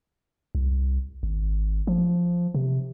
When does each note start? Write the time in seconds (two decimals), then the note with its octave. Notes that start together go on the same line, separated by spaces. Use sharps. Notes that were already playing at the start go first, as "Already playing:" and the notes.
0.55 C2
1.23 G#1
1.87 F3
2.55 C3